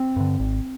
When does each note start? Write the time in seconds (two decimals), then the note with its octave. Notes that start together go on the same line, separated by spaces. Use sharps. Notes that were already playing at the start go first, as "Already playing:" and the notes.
Already playing: C4
0.16 G2 D3
0.40 G#1